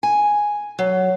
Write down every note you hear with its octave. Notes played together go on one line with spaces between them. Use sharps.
G#5
F#3